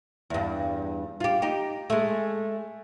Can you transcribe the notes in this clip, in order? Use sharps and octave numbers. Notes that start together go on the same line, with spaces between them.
E2 G2
F4 G4
D#4 G4
G#3 A3